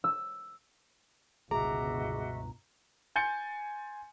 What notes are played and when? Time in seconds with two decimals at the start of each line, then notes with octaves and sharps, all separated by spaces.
0.04 E6
1.51 G1 C#2 B2 F#4 G#4 D#5 E5 A#5
3.16 G#5 C6 G6 A6 C#7 G7